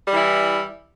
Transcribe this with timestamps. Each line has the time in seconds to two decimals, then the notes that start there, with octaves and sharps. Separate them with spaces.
0.07 G3
0.11 E3
0.16 E4